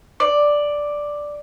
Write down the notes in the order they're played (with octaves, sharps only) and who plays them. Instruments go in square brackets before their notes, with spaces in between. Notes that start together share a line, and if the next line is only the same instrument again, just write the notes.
[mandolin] D5